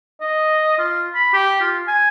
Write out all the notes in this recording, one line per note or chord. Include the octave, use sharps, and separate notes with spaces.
D#5
F4
B5
G4
F4
G#5